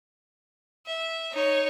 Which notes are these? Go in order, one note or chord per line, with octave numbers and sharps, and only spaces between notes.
E5
D#4 C#5